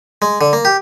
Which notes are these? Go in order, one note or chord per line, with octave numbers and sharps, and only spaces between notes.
G#3
D3
A#3
G4